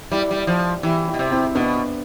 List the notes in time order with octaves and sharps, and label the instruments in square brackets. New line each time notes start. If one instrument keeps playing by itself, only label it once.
[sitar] G3 [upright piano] E4 G4
[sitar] G3
F3
[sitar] E3 [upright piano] E4 G4
[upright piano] E4 G4
[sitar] B2
C3
[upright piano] C4 E4
[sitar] B2 [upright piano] B3 D4